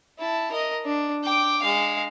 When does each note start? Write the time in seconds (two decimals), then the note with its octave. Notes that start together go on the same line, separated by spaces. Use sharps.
0.19 E4 A5
0.52 A#4 D#5
0.85 D4
1.23 G5 D6
1.62 G#3 F5